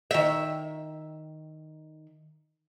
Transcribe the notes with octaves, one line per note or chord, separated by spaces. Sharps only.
D#3 E5